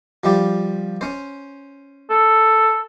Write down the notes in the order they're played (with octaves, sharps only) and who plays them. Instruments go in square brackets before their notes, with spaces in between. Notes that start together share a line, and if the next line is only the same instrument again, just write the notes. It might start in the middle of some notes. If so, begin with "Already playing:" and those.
[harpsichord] F3 G3 G4
C#4 C5
[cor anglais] A4